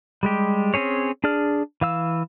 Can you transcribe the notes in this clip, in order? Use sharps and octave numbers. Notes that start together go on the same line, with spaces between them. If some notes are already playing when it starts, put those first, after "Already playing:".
G3 G#3 G4
C4 C#4 G#4 C#5
D4 G#4 D5 F6
E3 F5 E6